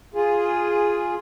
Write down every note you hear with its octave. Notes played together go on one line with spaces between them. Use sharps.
F4 G#4